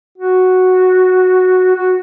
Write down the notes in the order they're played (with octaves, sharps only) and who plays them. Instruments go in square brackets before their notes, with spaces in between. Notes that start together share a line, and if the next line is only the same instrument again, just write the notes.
[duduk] F#4
F#4